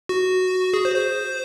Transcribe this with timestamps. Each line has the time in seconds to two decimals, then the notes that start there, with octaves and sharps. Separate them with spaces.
0.09 F#4
0.74 G#4
0.85 C5
0.96 C5